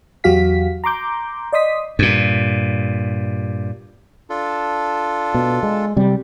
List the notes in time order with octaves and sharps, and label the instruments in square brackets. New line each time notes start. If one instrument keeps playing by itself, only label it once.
[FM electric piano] E2 F#3 F#4 G4 F5 B6
A#5 C6 D6 G6
D5 D#5 C6 D#6 B6
[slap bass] G2 A#2
[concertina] D4 F4 A4
[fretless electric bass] B2
G#3
C3 G3